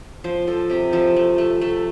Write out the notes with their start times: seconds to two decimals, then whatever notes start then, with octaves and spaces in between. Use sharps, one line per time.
0.24 F3 C5
0.47 F3 A4
0.70 C3 G4
0.92 F3 A4
1.16 A3
1.38 A3
1.61 A3